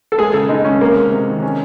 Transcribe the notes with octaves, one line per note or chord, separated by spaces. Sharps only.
A4
G#3 G#4
C#3 A4
G#3 D#4
G#3 C#4
C3 A#3
G#3
C3
D#3
C#4